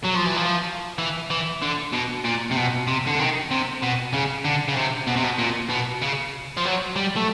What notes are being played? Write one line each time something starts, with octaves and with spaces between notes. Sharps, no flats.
F#3
F3
E3
F3
E3
E3
D3
B2
A#2
C3
B2
C3
D3
D#3
C3
B2
C#3
D3
C#3
C3
B2
C3
B2
A#2
B2
C#3
F3
F#3
G3
A3